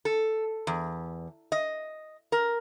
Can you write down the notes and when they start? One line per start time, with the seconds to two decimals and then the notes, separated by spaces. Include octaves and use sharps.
0.05 A4
0.67 E2
1.52 D#5
2.32 A#4